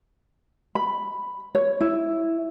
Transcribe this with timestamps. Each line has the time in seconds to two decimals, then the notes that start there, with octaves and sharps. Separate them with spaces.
0.75 B5
1.55 C#5
1.81 E4